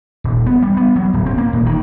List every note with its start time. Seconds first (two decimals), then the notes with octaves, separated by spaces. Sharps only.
0.24 D#1
0.46 B3
0.62 G3
0.77 B3
0.96 F#3
1.14 D1
1.26 C4
1.38 A#3
1.53 D#1
1.66 D#3